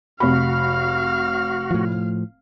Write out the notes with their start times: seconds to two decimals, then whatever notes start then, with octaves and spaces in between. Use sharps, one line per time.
0.20 F1 F#4 F5 B5 F6
1.71 A2 F3